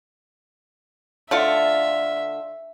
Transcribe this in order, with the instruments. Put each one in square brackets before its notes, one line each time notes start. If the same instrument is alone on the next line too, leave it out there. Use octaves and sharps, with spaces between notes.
[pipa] D3 A3 F4 [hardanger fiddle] E5